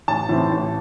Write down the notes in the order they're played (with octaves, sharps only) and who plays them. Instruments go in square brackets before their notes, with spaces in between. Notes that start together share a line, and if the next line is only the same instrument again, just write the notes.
[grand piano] A1 A5
A2 E3 C4
A1